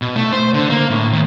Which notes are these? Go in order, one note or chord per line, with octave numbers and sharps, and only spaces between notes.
B2
A3
C5
D3
A#3
A2
D#2